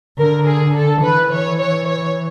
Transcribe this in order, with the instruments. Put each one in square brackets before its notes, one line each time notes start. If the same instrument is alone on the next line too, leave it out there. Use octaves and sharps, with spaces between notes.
[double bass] D3 [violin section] A#4
[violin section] G#4
A4
[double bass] E3 [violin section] B4
[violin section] C#5
C#5
C#5